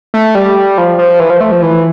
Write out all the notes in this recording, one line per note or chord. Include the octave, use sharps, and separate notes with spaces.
A3
G3
F3
F3
E3
F3
A3
F3
E3